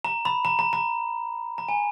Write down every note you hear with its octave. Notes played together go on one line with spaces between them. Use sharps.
A#5
B5
A#5
A#5
A#5
A#5
G#5